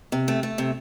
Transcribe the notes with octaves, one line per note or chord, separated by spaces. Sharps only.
C3
A3
A3
C3